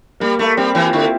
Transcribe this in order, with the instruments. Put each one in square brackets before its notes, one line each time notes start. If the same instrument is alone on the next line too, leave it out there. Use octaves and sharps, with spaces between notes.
[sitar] G3 [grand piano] A#3
[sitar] A3 [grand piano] A#3
[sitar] G3 [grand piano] C4
[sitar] E3 [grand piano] C4
[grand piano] F4
[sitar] D3 [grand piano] E4